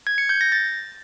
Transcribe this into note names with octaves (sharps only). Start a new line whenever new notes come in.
G#6
C#7
G6
A#6
A6